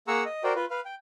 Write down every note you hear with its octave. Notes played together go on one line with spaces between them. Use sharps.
A#3 G#4 F#5 A#5 C#6 E6
D#5
F#4 A#4 C5 D5 G5
F4 B4
B4 F5
G5